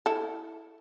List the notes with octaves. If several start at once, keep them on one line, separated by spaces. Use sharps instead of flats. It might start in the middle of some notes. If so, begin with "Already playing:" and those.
E4 A4